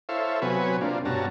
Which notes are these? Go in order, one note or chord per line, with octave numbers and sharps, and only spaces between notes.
E4 A4 C5 C#5 E5 F5
C3 F#3 B3 B4 C#5 G#5
C3 A#3 D4 F4
G2 B2 C#4 F#4 A5 A#5